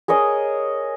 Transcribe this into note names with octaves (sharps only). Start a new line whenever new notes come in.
G#4 A#4 C#5 D#5